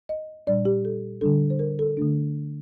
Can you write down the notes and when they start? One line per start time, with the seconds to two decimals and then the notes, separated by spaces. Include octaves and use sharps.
0.09 D#5
0.47 A#2 G3 D4 D5
0.65 G4
0.85 A4
1.21 D3 G3 D4 A4
1.50 C5
1.59 A#4
1.79 A4
1.97 D3 A3 D4